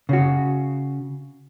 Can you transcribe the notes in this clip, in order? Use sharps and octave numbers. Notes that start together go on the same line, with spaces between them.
C#3 F#4